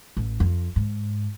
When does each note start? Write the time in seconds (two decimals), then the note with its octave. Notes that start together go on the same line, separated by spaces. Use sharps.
0.17 A1
0.40 F2
0.76 G#2